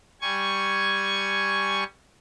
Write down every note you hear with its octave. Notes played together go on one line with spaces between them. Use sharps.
G3 G#5 C#6 G#6